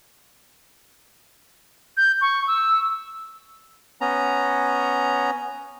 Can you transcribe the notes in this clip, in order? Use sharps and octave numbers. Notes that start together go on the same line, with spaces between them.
G6
C#6
E6
B3 C#4 A#5